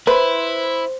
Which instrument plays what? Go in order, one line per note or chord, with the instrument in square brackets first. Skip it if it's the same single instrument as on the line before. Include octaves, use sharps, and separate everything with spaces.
[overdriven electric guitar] E4 [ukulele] B4 [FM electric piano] C5